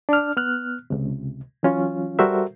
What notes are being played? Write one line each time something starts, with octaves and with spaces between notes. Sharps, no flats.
D4 F6
B3 F6 F#6
C#2 C3
E3 F#3 C#4 F4
G3 F#4 A4 A#4 C5 E5